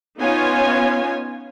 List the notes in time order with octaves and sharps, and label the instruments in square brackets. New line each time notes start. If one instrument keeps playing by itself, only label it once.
[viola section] B3 C#4 D#4 F4 C#5 G#5